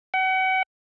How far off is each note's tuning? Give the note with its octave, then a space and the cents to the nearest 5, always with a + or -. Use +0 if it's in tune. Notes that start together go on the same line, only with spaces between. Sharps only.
F#5 +35